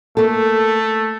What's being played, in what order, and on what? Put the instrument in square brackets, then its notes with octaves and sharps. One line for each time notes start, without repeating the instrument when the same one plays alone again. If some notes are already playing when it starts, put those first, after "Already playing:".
[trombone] A3 [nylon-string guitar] A#3 A4